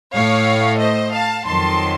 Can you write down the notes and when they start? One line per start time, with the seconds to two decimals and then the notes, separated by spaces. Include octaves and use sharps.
0.13 A2 A3 C#5 F5
0.80 C5 D#5
1.13 F5 A5
1.46 F2 D#3 F#3 A5 C6